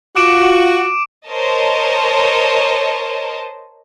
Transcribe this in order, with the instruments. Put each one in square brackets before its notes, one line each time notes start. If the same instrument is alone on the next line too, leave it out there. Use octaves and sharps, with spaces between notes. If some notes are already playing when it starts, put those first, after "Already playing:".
[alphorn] F4 [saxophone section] F#4 [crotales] D6 D7 E7
[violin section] A#4 C5 C#5 D#5 A5